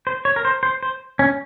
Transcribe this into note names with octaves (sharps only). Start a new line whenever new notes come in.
C5
C#5
A#4
C5
C5
C5
C#4